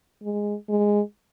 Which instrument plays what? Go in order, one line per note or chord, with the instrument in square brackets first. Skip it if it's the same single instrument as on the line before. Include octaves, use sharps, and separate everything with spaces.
[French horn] G#3
G#3